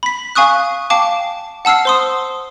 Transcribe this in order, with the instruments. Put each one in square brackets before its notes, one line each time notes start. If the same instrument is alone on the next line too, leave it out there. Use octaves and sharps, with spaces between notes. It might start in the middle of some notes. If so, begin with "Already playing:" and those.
[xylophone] B5 B6
F5 G#5 C#6 D#6 F#6
F5 G5 A5 D6
F#5 A5 E6 F6 C7
C5 C6 D#6